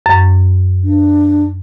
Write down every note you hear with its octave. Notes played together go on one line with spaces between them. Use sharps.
F#2
D4